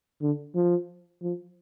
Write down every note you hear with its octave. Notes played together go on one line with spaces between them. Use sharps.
D3
F3
F3